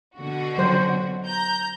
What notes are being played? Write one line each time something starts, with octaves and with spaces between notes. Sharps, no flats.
B2 D3 F#4
F#3 C5
A#5 G6